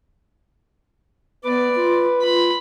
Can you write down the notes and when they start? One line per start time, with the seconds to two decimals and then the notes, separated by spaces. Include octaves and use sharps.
1.45 B3 B4 D5
1.76 F4
2.22 F4 B5